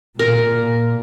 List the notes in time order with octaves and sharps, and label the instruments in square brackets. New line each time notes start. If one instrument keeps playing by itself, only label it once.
[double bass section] A#2 [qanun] A#4